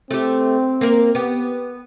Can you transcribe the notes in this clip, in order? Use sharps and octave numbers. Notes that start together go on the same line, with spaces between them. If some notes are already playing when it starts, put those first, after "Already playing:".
A3 C4 G4
A#3 A#4
B3 G4